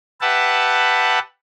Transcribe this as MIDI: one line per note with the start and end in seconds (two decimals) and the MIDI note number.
0.21 1.19 67
0.21 1.19 71
0.21 1.19 76
0.21 1.19 78
0.21 1.19 81